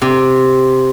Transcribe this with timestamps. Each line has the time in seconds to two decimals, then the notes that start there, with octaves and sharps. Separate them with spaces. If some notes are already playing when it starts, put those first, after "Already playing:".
0.02 C3